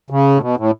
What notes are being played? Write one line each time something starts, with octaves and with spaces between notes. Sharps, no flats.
C#3
A2
B2
A2